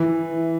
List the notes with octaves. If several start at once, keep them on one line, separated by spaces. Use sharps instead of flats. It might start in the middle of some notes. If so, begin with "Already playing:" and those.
Already playing: E3 E4